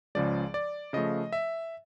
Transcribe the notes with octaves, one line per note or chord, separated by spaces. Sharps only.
C#2 C#3 F3 G#3 D5
D5
C#3 F3 A3 D#5
E5